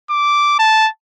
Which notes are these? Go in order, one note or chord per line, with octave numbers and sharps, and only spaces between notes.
D6
A5